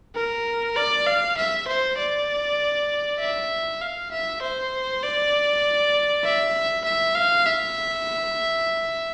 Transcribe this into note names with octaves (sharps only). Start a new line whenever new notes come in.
A#4
D5
F5
E5
C5
D5
E5
F5
E5
C5
D5
E5
E5
F5
E5